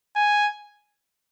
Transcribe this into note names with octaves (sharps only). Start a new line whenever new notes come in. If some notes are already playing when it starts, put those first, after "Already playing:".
G#5